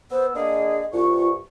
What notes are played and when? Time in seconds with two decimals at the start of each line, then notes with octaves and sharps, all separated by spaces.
0.11 B3 C5 E6
0.35 D3 A#3 G#4 D#5
0.93 C2 G2 F4 C#6